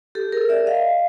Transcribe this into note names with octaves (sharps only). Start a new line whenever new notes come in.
G4 A4
G#4 A#4
D5 E5
D#5 F5